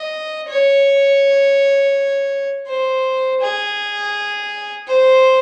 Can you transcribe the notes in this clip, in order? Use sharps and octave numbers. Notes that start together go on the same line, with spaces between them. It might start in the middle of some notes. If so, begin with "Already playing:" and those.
Already playing: D#5
C#5
C5
G#4
C5